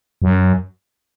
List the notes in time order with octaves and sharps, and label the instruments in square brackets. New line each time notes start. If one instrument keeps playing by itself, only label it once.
[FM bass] F#2